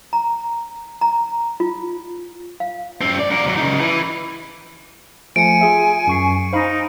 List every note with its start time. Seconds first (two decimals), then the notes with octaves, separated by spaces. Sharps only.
0.13 A#5
1.01 A#5
1.60 F4
2.60 F5
3.01 F#2 C4
3.19 D5
3.30 D4 A#4
3.45 D#2 F#3
3.57 C#3 D#4
3.80 E3 B4
5.36 F3 A3 G#5 C#7 D7
5.61 F4 G#4 E5
6.07 F#2 C#6 C7
6.53 D#4 C5 F5 B5